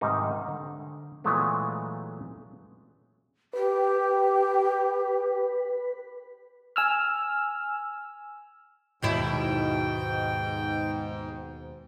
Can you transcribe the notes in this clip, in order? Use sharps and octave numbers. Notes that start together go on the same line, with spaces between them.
G#2 C3 D#3 G3 D#4
D3
A#2 E3 F#3 G#3 A3 B3
G4 B4
G#5 E6 F6
D#2 G#2 B2 E4 G5